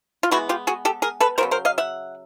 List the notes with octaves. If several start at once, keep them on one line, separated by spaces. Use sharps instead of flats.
F4
E3 G#3 B3 E4 F#4
F4 G4
F#4 G#4
G4 A4
G#4 A#4
A4 B4
C#3 F#3 B3 A#4 C5
A#4 C5
D#5 F5
E5 F#5